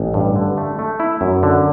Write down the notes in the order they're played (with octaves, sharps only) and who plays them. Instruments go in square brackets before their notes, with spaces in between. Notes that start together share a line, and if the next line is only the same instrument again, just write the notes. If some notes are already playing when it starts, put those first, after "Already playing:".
Already playing: [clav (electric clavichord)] A1
G2
D3
A3
A3
E4
F#2
D3